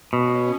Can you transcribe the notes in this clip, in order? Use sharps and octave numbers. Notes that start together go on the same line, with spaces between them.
B2 C#4